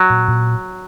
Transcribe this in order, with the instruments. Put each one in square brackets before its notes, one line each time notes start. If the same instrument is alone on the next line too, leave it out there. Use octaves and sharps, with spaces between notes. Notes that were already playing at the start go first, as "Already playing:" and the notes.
Already playing: [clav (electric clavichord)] F#3
[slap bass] A#2
A#2